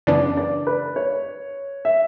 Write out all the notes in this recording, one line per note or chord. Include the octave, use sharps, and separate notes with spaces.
F#2 C#3 E3 B3 D4 D5
D5
B4
C#5
E5